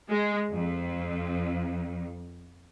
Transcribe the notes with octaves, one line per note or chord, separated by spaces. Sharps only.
G#3
F2